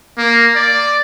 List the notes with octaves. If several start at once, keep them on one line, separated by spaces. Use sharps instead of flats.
A#3
D5